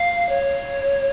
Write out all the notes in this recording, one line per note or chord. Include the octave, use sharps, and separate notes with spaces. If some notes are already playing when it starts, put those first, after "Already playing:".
Already playing: F5
C#5